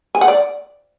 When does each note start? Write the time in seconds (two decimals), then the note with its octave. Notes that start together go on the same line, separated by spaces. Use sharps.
0.15 G#5
0.21 F#5
0.28 D5